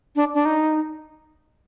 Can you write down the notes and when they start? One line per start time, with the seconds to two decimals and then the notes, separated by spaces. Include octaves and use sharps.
0.16 D4
0.34 D4
0.45 D#4